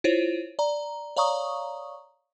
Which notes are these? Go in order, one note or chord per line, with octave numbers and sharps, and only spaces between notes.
E4 F4 C5 C#5
D5 A#5
C#5 D5 F5 A#5 C#6 D#6